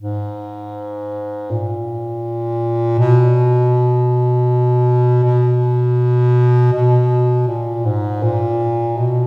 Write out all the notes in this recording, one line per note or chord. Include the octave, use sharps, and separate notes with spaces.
G#2
A#2
B2
B2
B2
A#2
G#2
A#2
B2